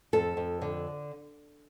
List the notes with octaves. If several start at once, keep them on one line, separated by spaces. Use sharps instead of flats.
F2 A4
F2
D3